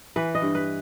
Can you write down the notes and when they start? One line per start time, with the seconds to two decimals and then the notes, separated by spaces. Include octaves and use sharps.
0.16 E3 B4
0.35 D#5
0.42 G2
0.55 B4